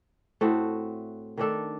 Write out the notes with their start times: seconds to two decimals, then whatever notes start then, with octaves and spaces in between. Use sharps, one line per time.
0.41 A2 A3 C4 F#4
1.37 D#3 A3 D4 A4